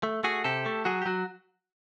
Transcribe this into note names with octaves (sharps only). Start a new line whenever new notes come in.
A3
A3 F#4 G#4
C3 G4 A4
A3
F#3 F#4 G#4
G4
F#3 F#4